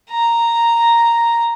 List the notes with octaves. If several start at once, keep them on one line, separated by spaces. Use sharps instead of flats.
A#5